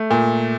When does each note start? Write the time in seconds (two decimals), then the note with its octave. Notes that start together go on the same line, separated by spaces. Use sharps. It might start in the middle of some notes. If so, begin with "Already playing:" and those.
Already playing: A3
0.11 A#2